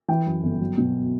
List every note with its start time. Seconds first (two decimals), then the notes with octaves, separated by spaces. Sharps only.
0.08 E3 G5
0.26 F#2
0.43 G1
0.61 F#3
0.78 B2